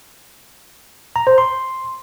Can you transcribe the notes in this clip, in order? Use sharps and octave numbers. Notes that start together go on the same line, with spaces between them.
A#5
C5
C6